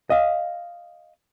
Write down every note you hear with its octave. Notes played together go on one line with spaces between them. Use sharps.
D#5 F5